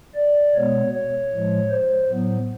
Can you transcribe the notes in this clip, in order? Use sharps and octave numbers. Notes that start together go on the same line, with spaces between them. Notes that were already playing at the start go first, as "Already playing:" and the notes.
D5
B2 G#3 B3 C#5
C#5
A2 F3 G#3
C5
A2 F#3 B3